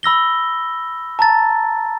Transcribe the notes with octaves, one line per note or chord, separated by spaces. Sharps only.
B5 E6 A#6 G7
A5 A#5 A6